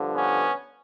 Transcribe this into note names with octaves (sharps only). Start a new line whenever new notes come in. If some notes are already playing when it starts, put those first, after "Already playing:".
Already playing: G2 D3 F3
B3 C#4